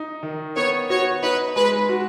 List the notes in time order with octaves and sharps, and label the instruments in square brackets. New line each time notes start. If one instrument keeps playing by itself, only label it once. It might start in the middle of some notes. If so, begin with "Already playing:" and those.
Already playing: [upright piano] D#4
D#3
[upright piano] B3 [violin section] C#5
[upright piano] F#4 [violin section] C#5
[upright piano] D#4 [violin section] B4
[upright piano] G#3 [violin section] B4
[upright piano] F#4